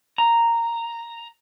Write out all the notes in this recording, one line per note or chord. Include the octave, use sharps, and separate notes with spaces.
A#5